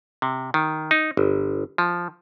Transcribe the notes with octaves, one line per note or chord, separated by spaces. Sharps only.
C3
D#3
D#4
G1
F3